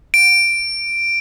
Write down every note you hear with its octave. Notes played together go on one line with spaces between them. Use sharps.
D7